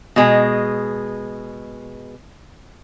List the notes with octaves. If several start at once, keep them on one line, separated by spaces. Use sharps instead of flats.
B2 G#3